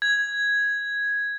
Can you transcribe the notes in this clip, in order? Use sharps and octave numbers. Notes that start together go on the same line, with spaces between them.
G#6